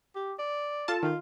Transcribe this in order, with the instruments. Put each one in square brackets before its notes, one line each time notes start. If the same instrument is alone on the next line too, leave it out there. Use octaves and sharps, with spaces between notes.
[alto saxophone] G4
D5
[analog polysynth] F4 A4 A5
[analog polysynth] D#3 [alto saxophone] F4